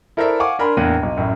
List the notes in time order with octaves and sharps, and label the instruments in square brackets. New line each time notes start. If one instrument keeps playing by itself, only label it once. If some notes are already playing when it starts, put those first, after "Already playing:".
[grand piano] E4 A4 A#4 C5 D5 E5
F5 F#5 G#5 C#6 D6
D4 A#4 G#5 B5 C6
E2 A2 A#3 D4 D#7
B1
A1 F#2 A2